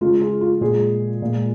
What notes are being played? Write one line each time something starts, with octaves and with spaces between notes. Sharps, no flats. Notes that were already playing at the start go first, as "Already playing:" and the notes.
C#3 G#3 F4
G#4
F4
A#2 G#3 G#4
A#2 G#3